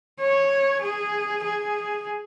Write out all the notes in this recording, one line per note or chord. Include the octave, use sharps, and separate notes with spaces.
C#5
G#4
G#4